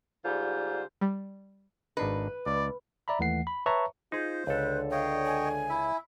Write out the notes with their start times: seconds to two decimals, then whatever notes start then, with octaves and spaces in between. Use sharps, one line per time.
0.23 G#2 D3 G3 F4 C5
1.01 G3
1.97 G#1 D4 D#4 B4
2.46 C#2 D5
3.08 D5 E5 A#5 B5
3.19 D#2 E3 A3 F#5 C7
3.47 B5
3.66 B4 C#5 E5 A5 A#5 C#6
4.12 D#4 F4 G#4 C5
4.47 C#2 D3 A4 B4
4.91 C#5 D#5 F5 G5
5.26 G#5
5.70 E4 E5